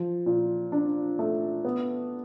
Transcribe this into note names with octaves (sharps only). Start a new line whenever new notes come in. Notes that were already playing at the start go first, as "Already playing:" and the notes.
Already playing: F3
A#2
D4
A3
B3